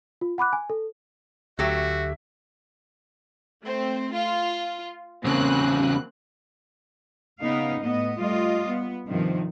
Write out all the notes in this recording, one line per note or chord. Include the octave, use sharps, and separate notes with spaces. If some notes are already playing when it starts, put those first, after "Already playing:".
F4
F#5 B5 D6 F#6
G#5
A4
D2 F#3 A3 F#4 G4 E5
A3 C4
F4
E2 C#3 A#3 C4 F#6
C#3 B3 D#4 F5
A2 B3 D#5
G3 A3 F4 D#5
B3
G2 C3 D#3 F3